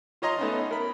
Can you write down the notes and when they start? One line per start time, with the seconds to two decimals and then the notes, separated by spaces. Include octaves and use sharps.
0.22 F4 C#5 D#5 A#5 C6
0.38 A3 B3 C#4 D#4
0.71 A#4 B5